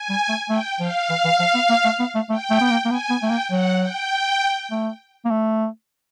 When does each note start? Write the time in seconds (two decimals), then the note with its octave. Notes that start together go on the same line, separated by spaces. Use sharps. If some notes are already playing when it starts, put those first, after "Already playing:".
Already playing: G#5
0.09 G3
0.29 A3
0.49 A3 G5
0.79 F3 F5
1.10 E3
1.24 E3
1.39 F3
1.54 B3
1.69 A#3
1.85 A3
2.00 B3
2.15 A3
2.30 A3 G5
2.50 A3
2.61 B3
2.70 A#3
2.85 A#3
2.90 B3 G#5
3.10 B3
3.20 A3 G5
3.30 A#3
3.50 F#3 F#5
3.81 G5
4.71 A3
5.25 A#3
5.31 A3